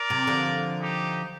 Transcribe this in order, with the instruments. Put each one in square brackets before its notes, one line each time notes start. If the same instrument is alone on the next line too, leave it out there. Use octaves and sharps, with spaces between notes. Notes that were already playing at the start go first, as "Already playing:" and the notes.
Already playing: [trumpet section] A#4 D5
[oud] C3
D3 F3
[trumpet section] D#4 G4